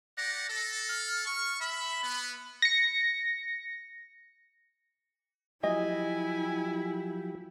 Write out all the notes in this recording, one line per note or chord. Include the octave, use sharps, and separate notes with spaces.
G4 D5 F#5 A#6
A4
F6
C#6
E5 B5
B3
A#6 C#7
F3 F#3 E4 G4 D#5 G#5